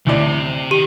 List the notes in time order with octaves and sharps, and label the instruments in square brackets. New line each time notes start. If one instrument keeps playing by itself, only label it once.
[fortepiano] D2 A2 D5 [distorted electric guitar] C3
[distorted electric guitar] D#3 [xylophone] G4